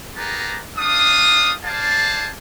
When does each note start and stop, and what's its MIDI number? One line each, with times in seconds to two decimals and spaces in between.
0.16 0.59 59
0.16 0.59 67
0.16 0.59 68
0.16 0.59 70
0.16 0.59 81
0.16 0.59 82
0.77 1.52 57
0.77 1.52 62
0.77 1.52 77
0.77 1.52 87
1.63 2.29 68
1.63 2.29 72
1.63 2.29 74
1.63 2.29 77
1.63 2.29 81